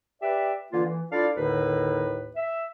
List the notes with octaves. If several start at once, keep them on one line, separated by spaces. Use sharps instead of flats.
G4 B4 D5 E5
D3 E3 A#3 F4
E3
D4 E4 F4 A4 D5 F5
D#2 A2 D3 D#4 B4
E5